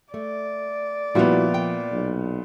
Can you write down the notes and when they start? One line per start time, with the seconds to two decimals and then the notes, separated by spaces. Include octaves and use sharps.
0.14 A3 D5
1.15 A#2 F3 G3 B3 E4 F#4
1.54 G5
1.92 B1